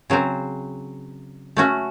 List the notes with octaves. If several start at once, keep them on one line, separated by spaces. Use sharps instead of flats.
C#3 F#3 C4
A3 C#4 F#4